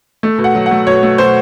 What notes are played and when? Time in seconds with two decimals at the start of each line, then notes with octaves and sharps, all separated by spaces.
0.23 A3
0.38 B2
0.44 F#5
0.55 F#3
0.66 F#5
0.71 A3
0.87 B2 C#5
1.03 A3
1.18 B2 C5